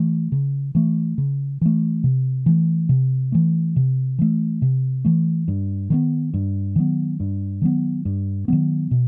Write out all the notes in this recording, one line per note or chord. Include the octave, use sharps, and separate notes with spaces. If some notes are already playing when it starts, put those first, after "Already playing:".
Already playing: E3 A3
C#3
E3 A3
C#3
E3 A3
C3
E3 A3
C3
E3 A3
C3
E3 A3
C3
E3 A3
G2
D#3 F#3 B3
G2
D#3 F#3 B3
G2
D#3 F#3 B3
G2
D#3 F#3 B3
B2